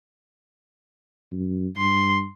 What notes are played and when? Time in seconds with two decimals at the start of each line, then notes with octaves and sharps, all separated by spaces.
1.32 F#2
1.77 G2 C6